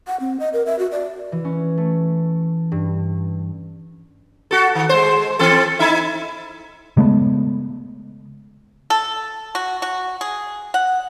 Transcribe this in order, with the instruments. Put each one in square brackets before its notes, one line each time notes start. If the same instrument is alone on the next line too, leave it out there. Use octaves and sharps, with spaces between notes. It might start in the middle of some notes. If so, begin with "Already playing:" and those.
[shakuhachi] F#5
C4
D#5
A#4
E5
F#4
D5
[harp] E3
C#4
A3
G2
[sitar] F#4 A4
D#3
G#3 C5
E3 C4 A4
D#4 E4 E5
[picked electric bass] C#3 G#3 A3 B3
[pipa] A4
F#4
F#4
G#4
F#5